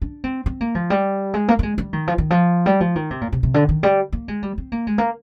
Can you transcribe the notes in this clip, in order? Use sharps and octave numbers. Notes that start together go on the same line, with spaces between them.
D4
C4
C4
A#3
F3
G3
G#3
A#3
A#3
G#3
G3
D#3
F3
D#3
F3
G3
F3
D#3
C3
A#2
C3
C3
D3
D#3
G3
A#3
G#3
G3
C4
A#3
G#3
A#3